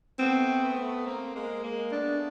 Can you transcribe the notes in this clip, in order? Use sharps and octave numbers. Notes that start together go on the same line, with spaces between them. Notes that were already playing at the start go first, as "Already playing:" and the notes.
A3 B3 C4
A3 B3
A#3 C4
G#3 A#3
G#3 A#3
A3 B3 D4